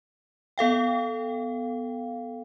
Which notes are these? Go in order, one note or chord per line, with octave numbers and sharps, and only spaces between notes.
B3 A4 F5 G5